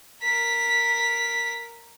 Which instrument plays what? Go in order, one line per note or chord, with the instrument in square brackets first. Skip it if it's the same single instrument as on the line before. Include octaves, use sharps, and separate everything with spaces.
[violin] A#4 B6